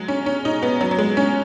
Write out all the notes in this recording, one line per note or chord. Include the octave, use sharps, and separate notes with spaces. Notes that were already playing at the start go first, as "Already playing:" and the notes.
Already playing: F#3 G#3
C#4
C#4
D#4
B3
F#3
F#3
G#3
C#4